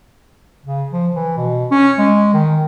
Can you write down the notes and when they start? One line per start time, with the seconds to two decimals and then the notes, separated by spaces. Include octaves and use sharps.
0.66 C#3
0.92 F3
1.15 E3
1.37 B2
1.71 C#4
1.99 G#3
2.34 D#3